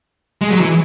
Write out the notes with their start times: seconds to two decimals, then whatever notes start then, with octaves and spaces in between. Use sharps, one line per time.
0.41 G#3
0.50 F#3
0.61 E3